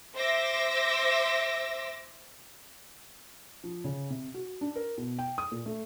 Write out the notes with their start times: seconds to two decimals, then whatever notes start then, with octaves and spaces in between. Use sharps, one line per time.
0.15 C5 E5 D6 E6 A#6
3.64 F3
3.84 C#3
4.10 C3
4.34 F#4
4.61 D4
4.76 A#4
4.98 B2
5.19 G5
5.38 D#6
5.52 A#2
5.66 A3